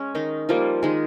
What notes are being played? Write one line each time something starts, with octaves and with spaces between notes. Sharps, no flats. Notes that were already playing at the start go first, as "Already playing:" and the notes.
Already playing: G#3 C#4
D#3 D#4
F3 G3 A#3 F4
D#3 G#3 G#4